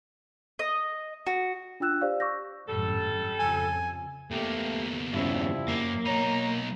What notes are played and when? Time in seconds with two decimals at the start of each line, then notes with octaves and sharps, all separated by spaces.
0.59 D#5
1.27 F#4
1.80 D4 F4 G5 E6 F#6 E7
2.01 G4 C5 D5 F5
2.20 C#6 D6 E6 G6 A#6
2.68 G#1 F#2 A2 G3 A4
3.39 F2 C#3 F3 G#5
4.31 E2 A3 A#3 G4
5.13 G2 C#3 F3 G3 C#4 E4
5.68 F#2 A#3
6.06 B1 D#4 C#5 A#5